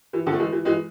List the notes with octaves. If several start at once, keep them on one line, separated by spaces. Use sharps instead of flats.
E3
D3 F3
A3
E3 G#3
E3
E3 G#3